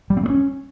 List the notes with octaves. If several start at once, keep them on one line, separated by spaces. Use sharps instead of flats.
G3
C4
A3
C#4